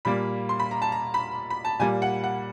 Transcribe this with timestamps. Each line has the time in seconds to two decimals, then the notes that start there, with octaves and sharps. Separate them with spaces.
0.05 A#2 G3 A#3 B5
0.49 C6
0.60 B5
0.71 A#5
0.82 A5
0.92 A#5
1.14 B5
1.50 B5
1.65 A5
1.79 A#2 G3 A#3 G#5
2.02 F#5
2.24 F#5